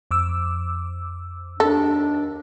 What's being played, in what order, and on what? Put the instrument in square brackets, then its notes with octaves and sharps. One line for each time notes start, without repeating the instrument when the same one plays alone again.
[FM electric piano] F2 D6 E6
[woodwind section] D#2 D4 [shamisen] A4